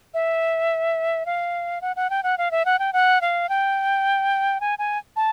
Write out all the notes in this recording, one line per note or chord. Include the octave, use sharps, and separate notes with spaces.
E5
F5
F#5
F#5
G5
F#5
F5
E5
F#5
G5
F#5
F5
G5
G#5
G#5
A5